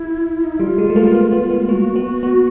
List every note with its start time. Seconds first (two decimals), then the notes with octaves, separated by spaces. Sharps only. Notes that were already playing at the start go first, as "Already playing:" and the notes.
Already playing: E4
0.44 D#4
0.52 E4
0.60 G3 F4
0.78 G#3
0.90 A3
0.96 A#3
1.14 B3
1.32 B3
1.51 B3
1.69 A#3 F#4
1.96 B3
2.23 B3